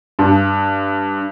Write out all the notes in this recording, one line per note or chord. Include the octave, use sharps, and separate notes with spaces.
G2